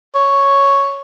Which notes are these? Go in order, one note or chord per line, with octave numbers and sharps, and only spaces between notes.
C#5